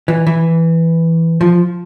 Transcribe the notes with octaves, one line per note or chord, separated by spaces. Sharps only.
E3
E3
F3